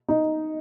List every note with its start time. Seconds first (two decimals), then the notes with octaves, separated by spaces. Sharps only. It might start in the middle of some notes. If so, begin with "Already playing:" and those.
0.09 D#4